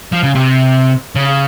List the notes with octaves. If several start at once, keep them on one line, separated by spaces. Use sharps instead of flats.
F3
C#3
C3
C#3